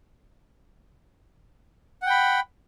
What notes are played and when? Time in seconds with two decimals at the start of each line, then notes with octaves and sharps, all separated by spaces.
2.02 F#5
2.06 G5
2.10 B5